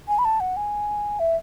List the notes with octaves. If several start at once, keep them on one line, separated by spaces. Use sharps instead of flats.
G#5
B5
A5
F#5
G#5
E5